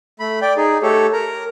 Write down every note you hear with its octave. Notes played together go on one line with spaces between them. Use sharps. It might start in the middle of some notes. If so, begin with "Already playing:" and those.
A3 B5
D5 G5
D#4 G#4
A3 G4 A4 C#5
A#4 A#5